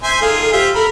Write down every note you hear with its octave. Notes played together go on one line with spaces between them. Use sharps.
C5 E5 G#5
D#3 F4 G#4 A4
C4 F4 G4 E5
A4 A#4 B5